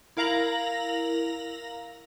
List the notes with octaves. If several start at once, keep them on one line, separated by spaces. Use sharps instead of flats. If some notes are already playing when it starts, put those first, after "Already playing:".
E4 A#4 F5 A#5 A#6 F#7